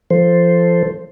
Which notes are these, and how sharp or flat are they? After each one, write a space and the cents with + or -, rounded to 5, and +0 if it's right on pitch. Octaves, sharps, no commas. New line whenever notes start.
F3 -20 A4 +0 C5 +0